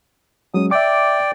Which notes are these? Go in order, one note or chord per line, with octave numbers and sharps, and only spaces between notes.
F#3 G#3 C#4 D#6
D5 E5 G5 D6